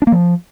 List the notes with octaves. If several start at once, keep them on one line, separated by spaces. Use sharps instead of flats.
D4
A#3
F3